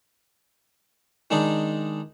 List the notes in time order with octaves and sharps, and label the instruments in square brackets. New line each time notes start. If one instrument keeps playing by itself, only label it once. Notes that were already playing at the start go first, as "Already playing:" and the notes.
[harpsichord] D#3 G#3 D4 D#4